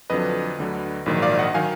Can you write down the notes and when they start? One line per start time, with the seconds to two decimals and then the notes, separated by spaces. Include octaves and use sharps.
0.10 F2 D3 F#3 B4 D#5
0.58 D2 D3 F#3
1.06 A#1 G#2 D#3 F#3
1.22 D5 F5
1.39 D#5 F#5
1.54 D#3 F#3 F5 G#5